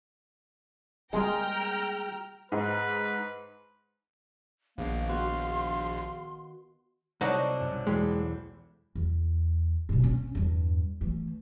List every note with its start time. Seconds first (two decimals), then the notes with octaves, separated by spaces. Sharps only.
1.13 G3 G#3 A#3 G#4 G5 A#5 F6
2.52 G#2 B4
4.78 A#1 D#3 A#3 B3 F5
5.09 B3 F#4 F5 C6
7.21 C2 D3 F#3 D4 D#4 F#4 C5
7.60 B1 F#2
7.87 E2 G#3 G5 B5
8.95 E2
9.89 G2 B2
10.02 C4 C#4
10.35 E2 G2
11.01 E3 A3